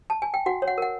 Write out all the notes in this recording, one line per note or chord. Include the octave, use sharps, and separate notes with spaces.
A5
G#5
G5
F#4 F#5
C#5
F#5
A#4 F#5